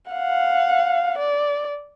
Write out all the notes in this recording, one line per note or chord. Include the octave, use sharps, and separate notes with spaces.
F5 F#5
D5